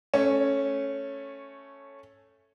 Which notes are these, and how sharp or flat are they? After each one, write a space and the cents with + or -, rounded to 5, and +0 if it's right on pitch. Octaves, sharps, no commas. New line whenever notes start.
A3 +0 C#4 -5